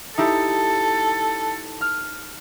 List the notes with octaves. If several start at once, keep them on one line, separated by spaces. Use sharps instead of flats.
D#4 E4 G4 A4
F6